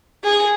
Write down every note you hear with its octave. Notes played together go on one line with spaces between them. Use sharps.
G#4